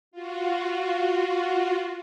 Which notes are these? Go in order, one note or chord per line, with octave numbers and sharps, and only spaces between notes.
F4 F#4